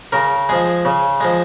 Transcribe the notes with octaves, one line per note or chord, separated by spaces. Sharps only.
C#3 A#4
F3 G#3 G#4
C#3
F3 G#3